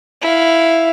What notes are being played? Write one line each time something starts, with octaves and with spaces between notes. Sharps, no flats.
E4 F5